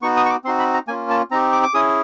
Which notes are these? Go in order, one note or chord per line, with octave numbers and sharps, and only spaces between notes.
B3 D#4 F#4 C#6
D#6
C#6
D6
C4 D#4 F#4 C6
B5
A#5
A#3 C#4 F4 G#5
A5
C4 D#4 G4 A#5
D6
D6
C#4 E4 G#4 D#6